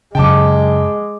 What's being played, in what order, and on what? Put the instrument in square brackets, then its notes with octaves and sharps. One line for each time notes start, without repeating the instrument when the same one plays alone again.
[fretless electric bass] F#2 C#3 [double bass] G#3 [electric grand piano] G5 A5 D6